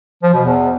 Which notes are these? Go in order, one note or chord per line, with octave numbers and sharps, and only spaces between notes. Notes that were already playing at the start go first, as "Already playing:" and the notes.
F3
B2
E2